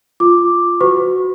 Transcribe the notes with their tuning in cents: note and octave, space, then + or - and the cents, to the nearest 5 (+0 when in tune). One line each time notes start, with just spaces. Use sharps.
F4 +0 D6 +0
F#4 +0 B4 +40 C#6 -20